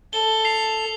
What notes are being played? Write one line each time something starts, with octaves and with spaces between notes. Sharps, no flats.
A4 G7
C7 F7 G7